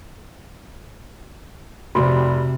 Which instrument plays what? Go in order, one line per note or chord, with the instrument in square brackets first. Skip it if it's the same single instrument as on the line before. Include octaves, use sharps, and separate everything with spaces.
[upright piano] F1 [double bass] C3 [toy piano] F#4 [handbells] D5 B5